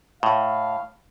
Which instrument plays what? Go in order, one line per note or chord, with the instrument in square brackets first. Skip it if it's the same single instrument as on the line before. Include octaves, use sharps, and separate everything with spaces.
[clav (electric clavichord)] A2 [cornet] F5